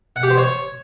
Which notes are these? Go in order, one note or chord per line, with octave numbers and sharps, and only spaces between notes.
F#5
G4
C5
C#5